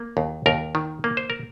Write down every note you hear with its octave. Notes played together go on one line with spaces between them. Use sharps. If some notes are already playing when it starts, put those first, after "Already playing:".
Already playing: A#3
D#2
D#2 A#4
D#3
A#3
C5
A#4